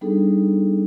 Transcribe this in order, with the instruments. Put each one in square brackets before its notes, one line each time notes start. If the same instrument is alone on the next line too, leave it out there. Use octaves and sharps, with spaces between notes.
[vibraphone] G3 B3 D4 D#4 G#4 A4